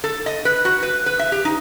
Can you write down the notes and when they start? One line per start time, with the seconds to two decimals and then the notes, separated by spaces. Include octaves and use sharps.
0.04 A4
0.26 D#5
0.45 B4
0.65 F#4
0.83 B4
1.06 B4
1.19 E5
1.32 G4
1.45 D#4